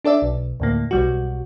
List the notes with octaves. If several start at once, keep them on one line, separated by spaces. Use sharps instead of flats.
D4 A4 D5 E5
B1
D2 A2 A#3
B1 G3 F#4